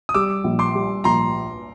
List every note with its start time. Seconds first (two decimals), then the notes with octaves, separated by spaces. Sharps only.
0.09 D#6
0.14 G3 D6 E6
0.44 A#1
0.59 C6 D6
0.75 G3
1.04 A#1 A#5 C6